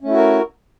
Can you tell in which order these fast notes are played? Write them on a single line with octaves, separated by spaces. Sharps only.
C#4 A3 E4 F#4 A#4